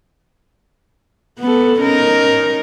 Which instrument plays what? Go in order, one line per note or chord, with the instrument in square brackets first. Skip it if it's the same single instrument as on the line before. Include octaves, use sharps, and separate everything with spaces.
[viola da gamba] B3 A4
C#4 D#4 A#4